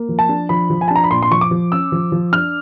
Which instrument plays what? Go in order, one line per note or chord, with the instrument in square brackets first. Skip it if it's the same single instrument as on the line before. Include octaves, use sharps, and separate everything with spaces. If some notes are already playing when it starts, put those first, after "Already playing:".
Already playing: [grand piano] A#3
F3
A5
D4
F3 B5
F3
G#5
A5
D4
A#5
B5
A#2 C6
C6
F3 C#6
D6
F3
C#4 E6
F3
F3
D4 F6